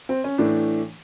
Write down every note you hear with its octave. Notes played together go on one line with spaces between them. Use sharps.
C4
C#4
A2 E3 A3 D4